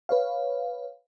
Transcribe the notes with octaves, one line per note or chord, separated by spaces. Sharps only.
B4 C#5 F5